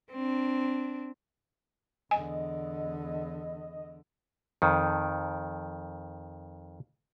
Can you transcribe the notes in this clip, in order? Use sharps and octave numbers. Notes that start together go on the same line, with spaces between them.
C4 D4
E2 D3 D#5 G#5
F2 D#3